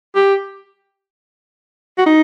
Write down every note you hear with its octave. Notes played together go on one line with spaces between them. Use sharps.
G4
F#4
D#4